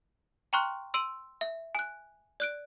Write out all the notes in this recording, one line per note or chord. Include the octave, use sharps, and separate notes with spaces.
G5 A#5 C6 C#6 F6 F#6
C6 E6 D7 D#7 F#7
E5
G#5 F#6
D5 F#6 D7